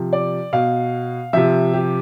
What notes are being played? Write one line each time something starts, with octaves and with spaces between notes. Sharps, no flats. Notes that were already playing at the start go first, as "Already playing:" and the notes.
Already playing: C3 F3
D5
B2 F5
C3 F3 E5
G4